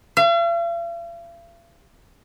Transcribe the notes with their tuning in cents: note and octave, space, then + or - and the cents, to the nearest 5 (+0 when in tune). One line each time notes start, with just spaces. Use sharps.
F5 -45